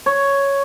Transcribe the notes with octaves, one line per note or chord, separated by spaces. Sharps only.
C#5